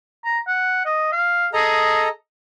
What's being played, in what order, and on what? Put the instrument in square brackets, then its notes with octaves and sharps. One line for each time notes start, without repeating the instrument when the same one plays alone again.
[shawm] A#5
F#5
D#5
F5
[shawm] G#4 [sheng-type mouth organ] A4 D#5 A#5